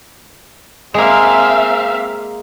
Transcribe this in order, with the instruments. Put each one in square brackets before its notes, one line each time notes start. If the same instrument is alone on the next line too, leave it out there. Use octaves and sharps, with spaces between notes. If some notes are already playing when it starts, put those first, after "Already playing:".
[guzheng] G#3 A#3 [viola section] C4 E5 F5